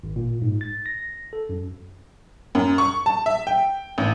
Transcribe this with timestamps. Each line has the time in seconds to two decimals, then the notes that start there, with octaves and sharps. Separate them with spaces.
0.04 G#1
0.16 A#2
0.42 G#2
0.61 A6
0.86 A#6
1.33 A4
1.49 F#2
2.55 F#2
2.78 C#6
3.06 A5
3.26 E5
3.47 G5
3.98 A1